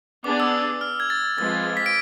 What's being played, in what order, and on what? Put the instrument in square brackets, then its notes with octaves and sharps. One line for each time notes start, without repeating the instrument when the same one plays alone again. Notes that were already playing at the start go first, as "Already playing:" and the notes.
[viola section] B3 D4 G#4 D5 [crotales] D6
[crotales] E6
F6
G#6
A6
[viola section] F3 G#3 C4 F4 B4 [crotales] A6
[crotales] B6
D7